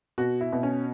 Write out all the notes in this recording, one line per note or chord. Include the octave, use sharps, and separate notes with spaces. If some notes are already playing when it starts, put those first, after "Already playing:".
B2 F#4
E4
B2
C#4